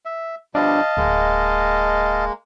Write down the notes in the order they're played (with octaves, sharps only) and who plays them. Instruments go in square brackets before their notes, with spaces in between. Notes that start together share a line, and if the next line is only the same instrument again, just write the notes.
[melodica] E5
[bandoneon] B2 F3 G3 [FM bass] D4 [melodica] D#5 F5 A5
[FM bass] D1 [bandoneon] G#3 A#3